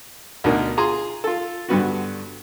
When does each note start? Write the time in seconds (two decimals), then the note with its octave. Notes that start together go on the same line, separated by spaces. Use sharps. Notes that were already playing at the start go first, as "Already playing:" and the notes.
0.44 D2 B2 D4 D#4 A#4
0.77 F4 G#4 A#5 C6
1.24 F4 A4
1.69 G2 D3 B3 F#4